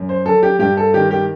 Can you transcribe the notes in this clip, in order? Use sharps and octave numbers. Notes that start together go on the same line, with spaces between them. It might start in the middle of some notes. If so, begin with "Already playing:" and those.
Already playing: F#2
C5
F#3 A4
G4
G2 G4
A4
D#3 G4
G4